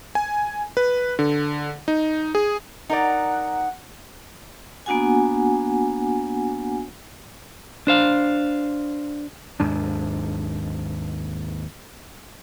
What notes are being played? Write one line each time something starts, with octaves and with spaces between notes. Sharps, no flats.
G#5
B4
D3
D#4
G#4
D#4 A#4 D5 F#5
A#3 B3 D4 F#4 F#5 G#5
D4 C5 F5
D#2 G#2 D4